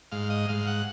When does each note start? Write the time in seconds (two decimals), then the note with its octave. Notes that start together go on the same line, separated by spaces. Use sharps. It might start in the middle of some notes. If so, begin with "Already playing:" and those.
0.12 G#2 F5
0.30 D#5
0.49 G#2 F5
0.67 F#5